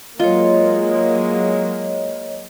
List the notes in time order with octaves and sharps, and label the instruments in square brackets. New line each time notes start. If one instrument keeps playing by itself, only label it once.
[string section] F#3 G#3 A#3 [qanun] F4 [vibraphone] C#5 D#5